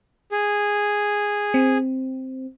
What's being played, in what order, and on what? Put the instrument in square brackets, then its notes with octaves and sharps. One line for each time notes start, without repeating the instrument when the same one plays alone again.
[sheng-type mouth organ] G#4
[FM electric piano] C4